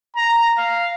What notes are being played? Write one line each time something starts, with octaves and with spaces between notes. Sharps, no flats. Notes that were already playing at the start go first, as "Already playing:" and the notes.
A#5
F5